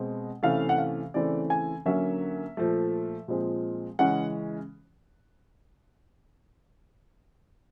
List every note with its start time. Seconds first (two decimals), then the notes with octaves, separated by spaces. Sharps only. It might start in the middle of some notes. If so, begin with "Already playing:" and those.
Already playing: B2 G#3 C4
0.43 C3 E3 A3 C#4 F5
0.69 F#5
0.78 F5
1.14 C#3 E3 A3 C4 D5
1.50 G#5
1.85 D3 F#3 A#3 C#4 E5
2.57 A#2 F3 A3
3.28 A#2 F3 G#3 C4
3.99 C#3 E3 G#3 C#4 F#5